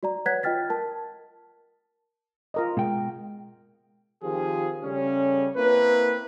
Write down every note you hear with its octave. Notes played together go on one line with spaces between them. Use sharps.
F#4 D5 A#5
B4 C#5 F#5 F#6 G#6 B6
F4 D#5 G5 F6 A6 B6
A#4 A5
F4 A#4 D#5
B2 G#3 G5
D#3 F3 C4 F4 G4 G#4
C#3 G3 A3 C#4
A#3 C4 E4 B4